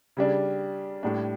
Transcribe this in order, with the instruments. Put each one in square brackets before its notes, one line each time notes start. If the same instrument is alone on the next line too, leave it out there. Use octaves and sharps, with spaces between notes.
[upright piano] C#3 G3 D4
A2 G3 D4